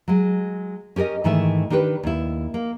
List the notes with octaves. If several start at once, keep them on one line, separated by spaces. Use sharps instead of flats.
F#3 G#3
C#4 G4 A4 A#4 D#5
G#2 D#3 E3 A3 E5
D#3 D4 G4 A4 B4
D#2 E4
A#3